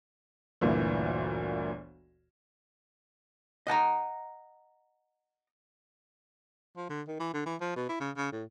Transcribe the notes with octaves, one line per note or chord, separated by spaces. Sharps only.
G1 D2 A#2 E3
D#5 F#5 A5 A#5
F3
D3
D#3
E3
D3
E3
F3
B2
E4
C#3
C#3
A2